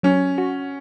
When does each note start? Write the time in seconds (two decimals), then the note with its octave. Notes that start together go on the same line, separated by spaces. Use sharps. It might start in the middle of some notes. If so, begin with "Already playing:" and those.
0.03 F#3 C#4
0.38 F#4